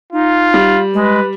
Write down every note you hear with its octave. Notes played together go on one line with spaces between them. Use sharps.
D#4 F4
G3
G#3 B4